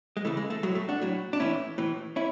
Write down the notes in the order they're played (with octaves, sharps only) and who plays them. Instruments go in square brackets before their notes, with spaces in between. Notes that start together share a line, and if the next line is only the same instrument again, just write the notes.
[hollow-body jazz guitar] G#3
C#3 E3 A3
G#3
A3
A2 F#3 G#3
A3
D4 F#4
A2 F#3
D4
A2 E3 C#4 E4
A2 E3
C#4 E4